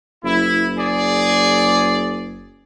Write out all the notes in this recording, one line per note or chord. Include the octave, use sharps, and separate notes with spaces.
F#1 E4
G#4 D5